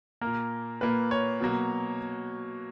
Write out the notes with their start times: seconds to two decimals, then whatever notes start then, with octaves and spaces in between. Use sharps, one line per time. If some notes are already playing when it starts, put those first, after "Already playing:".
0.21 A#2 A#3 A#4
0.81 A#2 A#3 B4
1.11 C#5
1.40 B2 F#3 A#3